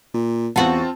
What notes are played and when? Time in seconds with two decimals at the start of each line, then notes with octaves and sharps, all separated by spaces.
0.14 A#2
0.56 E2 B3 C4 F4 F#4 A5